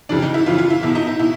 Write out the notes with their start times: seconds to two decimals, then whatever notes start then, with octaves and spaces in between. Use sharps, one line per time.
0.09 F2 C#3 E3 D4
0.22 D#4
0.34 E4
0.46 F2 C#3 E3 F4
0.58 F4
0.70 E4
0.82 E2 B2 E4
0.95 D#4
1.07 E4
1.19 B2 E4